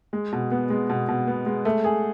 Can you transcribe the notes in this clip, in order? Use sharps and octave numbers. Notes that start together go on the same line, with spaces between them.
G#3
B2
B3
G#3
B2
B2
B3
G#3
A3
G#4